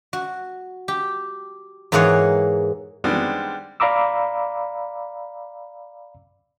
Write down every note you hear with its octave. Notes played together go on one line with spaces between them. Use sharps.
F#4
G4
G#2 E3 A#3 G#4 C#5 F#5
D#3 G3 G#3 B3 C4 D4
D5 F5 A#5 B5 D6 E6